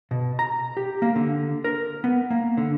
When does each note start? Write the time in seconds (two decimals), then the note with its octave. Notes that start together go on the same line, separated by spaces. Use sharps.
0.11 B2
0.39 A#5
0.77 G4
1.02 A#3
1.16 D3
1.64 A#4
2.04 B3
2.30 A#3
2.57 D3